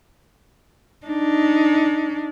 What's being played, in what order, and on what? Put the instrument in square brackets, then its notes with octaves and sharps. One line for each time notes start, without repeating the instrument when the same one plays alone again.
[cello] D4 D#4